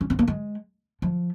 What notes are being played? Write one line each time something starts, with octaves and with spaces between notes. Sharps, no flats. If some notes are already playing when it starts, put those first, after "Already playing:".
C#4
C4
A#3
G#3
F3